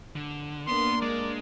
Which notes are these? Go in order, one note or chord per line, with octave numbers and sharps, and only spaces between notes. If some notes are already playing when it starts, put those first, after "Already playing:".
D3
A#3 B3 D4 A#4 C6
G#3 D5